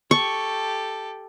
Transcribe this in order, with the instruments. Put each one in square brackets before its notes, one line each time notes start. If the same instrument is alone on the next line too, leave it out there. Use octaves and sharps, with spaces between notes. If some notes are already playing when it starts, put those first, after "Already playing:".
[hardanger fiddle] G4 A4 [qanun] C#6